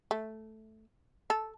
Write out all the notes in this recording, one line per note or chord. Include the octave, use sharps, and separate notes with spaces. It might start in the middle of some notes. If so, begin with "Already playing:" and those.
A3
A4